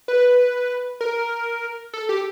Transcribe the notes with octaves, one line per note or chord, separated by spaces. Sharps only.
B4
A#4
A4
G4